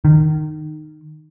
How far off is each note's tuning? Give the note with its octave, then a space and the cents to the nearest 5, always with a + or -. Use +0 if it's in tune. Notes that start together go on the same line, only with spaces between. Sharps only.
D#3 -20